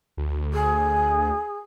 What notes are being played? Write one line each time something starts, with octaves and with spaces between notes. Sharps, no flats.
D2
G#4